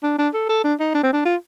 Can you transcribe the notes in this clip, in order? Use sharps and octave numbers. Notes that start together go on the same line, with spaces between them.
D4
D4
A4
A4
D4
D#4
D4
C4
D4
F4